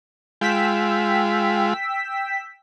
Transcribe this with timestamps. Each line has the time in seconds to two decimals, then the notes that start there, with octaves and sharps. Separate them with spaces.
0.41 G#3 F4 G5 E6 B6